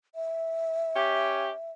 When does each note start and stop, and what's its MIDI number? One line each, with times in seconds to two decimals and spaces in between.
0.15 1.72 76
0.96 1.50 61
0.96 1.50 67